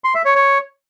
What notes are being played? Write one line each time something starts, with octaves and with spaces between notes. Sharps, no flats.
C6
E5
C#5
C#5